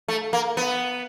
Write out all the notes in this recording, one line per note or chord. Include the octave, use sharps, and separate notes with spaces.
A3
A#3
B3